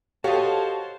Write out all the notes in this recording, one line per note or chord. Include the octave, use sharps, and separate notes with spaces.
F#4 G4 A4 C5 C#5 D#5 F5 A5